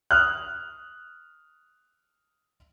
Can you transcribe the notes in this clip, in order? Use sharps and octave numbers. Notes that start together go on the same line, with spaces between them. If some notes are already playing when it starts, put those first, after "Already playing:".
D#6 F6 F#6